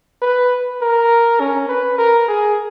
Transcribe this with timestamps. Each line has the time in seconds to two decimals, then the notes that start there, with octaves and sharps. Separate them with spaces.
0.22 B4
0.81 A#4
1.40 C#4
1.69 B4
1.98 A#4
2.28 G#4